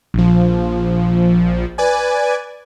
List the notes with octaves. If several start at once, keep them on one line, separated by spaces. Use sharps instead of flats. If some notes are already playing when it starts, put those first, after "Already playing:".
A#1 F3
B4 D5 G#5